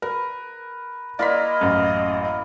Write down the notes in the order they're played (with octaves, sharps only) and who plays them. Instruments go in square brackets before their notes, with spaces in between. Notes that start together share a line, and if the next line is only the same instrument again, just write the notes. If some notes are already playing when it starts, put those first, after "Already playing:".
[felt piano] A#4 [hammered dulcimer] B4
[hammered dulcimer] A#3 E4 A#4 [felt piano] D5 C6 B6 [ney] D#5
[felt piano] A1 F#2